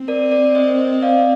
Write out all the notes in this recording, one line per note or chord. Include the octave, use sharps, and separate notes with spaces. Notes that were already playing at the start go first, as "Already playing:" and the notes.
Already playing: C4
A#4 D5
A#4 D5
C5 D#5
C5 D#5
D#5
D5 F5